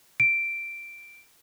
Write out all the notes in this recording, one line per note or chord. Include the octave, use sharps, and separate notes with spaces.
D7